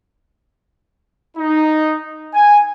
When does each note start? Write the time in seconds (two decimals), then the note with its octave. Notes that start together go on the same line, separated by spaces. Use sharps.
1.37 D#4
2.34 G#5